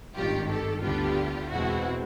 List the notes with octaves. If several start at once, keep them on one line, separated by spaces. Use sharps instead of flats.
G#1 G2 D#3 F4 G4
G4 A4
D2 D3 G3 B3 D4 F4 G4
E2 B2 G#3 C4 E4 F#4